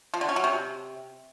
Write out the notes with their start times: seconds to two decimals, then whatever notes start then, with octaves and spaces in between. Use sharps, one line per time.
0.14 F3
0.21 D3
0.29 C#4
0.36 F#3
0.44 C3